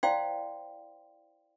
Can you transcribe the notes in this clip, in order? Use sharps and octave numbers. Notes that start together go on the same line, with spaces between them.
E4 C5 D5 F5 G5 C6